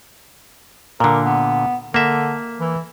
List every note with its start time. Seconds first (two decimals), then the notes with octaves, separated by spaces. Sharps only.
1.00 A#2 D3 A#4
1.26 B3
1.94 D3 A#3 E5
2.60 E3